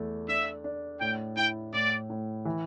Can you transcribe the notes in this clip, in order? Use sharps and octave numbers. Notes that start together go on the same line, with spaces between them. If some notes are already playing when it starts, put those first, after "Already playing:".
Already playing: E2 A3
D4 E5
D4
A2 G5
E4 G5
A2 D5
A2
E3